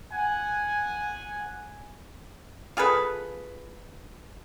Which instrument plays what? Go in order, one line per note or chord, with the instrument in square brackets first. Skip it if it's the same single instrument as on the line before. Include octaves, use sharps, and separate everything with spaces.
[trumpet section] F#5 G#5
[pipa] F4 G#4 A4 B4